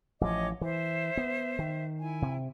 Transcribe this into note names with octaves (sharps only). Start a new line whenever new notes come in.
A1 F3 C#5 D#5 D6
E3 C5 E5
B3
D#3
E4 G#5
C3